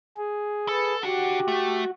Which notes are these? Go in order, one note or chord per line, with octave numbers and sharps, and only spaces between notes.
G#4
A4 B4
D4 F#4 G4 F#5
A3